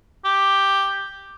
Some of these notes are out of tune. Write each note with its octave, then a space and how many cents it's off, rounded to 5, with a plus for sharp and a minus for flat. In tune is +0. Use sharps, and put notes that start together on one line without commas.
G4 +5